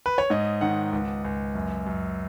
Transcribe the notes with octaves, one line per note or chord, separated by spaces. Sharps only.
B4
C#5
G#2 D#5
D#3 F#5
C#2
C#2
F#2
F#2